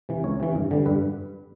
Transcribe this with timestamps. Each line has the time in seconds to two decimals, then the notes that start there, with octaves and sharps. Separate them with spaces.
0.09 C3 E3
0.24 C#2 C#5
0.40 C3 E3
0.55 G2
0.71 D3 G3
0.86 G2 B4